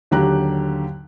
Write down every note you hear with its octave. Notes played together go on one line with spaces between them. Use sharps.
D#2 D3 F#3 G4 A#5 F#6